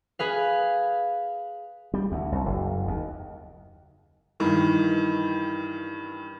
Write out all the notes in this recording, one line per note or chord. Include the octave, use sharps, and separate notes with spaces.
G#4 B4 F5
G3
D2
C2
F#1
D#2
G2 D#3 E3